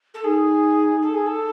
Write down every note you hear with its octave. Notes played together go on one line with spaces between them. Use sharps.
A4
D#4 G#4
A4
G#4
A4